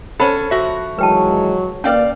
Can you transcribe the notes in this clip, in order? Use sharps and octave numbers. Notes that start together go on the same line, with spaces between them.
C#4 A4 C5 F#5 B5
F3 F#4 E5
D#3 E3 F#3 G#3 B4 G5 A5
A#2 C#4 B4 D5 F5 G5